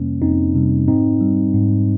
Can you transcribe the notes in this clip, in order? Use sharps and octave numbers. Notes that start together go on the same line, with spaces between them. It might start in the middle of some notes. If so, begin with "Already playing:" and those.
Already playing: F2 C3 G3 A#3 C#4
F2 C4 D#4
C3 G3
G#2 C4 D#4
G3
G#2